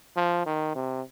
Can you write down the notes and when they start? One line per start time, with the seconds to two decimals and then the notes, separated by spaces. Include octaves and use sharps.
0.16 F3
0.46 D#3
0.75 C3